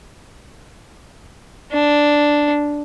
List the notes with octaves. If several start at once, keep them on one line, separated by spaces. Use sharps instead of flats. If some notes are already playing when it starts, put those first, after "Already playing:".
D4